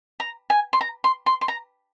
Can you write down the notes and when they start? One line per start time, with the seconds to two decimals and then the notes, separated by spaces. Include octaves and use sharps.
0.20 A#5
0.50 G#5
0.73 C6
0.81 A#5
1.04 C6
1.26 C6
1.41 C6
1.48 A#5